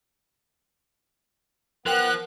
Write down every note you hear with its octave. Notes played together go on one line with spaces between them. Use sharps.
F3 B3 A#4 G5 F#6